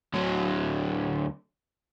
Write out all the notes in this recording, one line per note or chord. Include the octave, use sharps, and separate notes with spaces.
D2 F#3